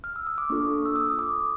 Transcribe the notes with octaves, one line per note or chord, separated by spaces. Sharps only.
F6
E6
D#6
D6
A#3 D4 F4 A4 C#6
E6
D#6
D6